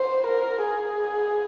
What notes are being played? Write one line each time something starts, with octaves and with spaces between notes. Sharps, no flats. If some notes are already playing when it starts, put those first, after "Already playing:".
Already playing: C5
A#4
G#4